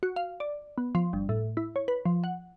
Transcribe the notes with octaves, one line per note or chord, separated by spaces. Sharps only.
F#4
F5
D5
B3
F3
G1
A2
E4
C#5
B4
F3
F#5